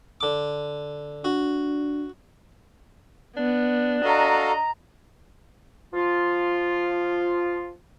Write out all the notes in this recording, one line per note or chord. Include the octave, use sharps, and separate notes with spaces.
D3 D6
D4 F#4
B3 D4
F#4 A4 D#5 F5 A#5
F3 F4